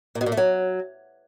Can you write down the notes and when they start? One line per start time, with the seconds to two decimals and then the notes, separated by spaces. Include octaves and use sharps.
0.15 A#2
0.21 B2
0.26 A#2
0.32 A3
0.37 F#3